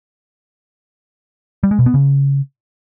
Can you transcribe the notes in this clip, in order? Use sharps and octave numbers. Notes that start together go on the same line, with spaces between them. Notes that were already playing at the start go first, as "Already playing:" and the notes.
G3
G#3
B2
B3
C#3